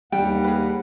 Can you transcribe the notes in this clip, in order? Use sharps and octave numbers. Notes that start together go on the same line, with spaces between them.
D#2 G3 F#5 G5
G#4 B4